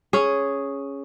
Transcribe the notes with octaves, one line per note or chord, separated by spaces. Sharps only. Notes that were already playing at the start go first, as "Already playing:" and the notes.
C#4 G#4